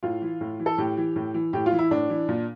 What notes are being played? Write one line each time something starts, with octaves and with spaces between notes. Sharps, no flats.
A2 F4
E3
A2
E3
A4
A2 G4
E3
A2
E3
A2 G4
F4
E3
E4
A2 D4
E3
A#2